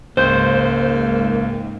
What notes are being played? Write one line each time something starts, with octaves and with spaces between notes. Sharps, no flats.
C#2 G#2 A#3 C5 G6